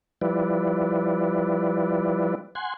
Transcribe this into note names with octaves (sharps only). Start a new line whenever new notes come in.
F3 G3 E4 B4 D5
F#5 G#5 C6